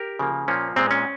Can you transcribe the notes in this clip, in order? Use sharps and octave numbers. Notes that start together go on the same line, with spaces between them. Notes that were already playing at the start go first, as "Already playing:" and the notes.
Already playing: G4 A#4
C#3 F3 A#3
A#2 F3 A#3 C#4
A#2 G#3 C4
C#4